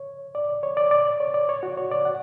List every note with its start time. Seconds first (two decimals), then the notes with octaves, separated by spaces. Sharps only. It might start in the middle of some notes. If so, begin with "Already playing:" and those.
Already playing: C#5
0.35 D5
0.63 C#5
0.77 D5
0.91 D5
1.20 C#5
1.34 D5
1.49 C#5
1.63 F#4
1.77 C#5
1.91 D5
2.05 F#5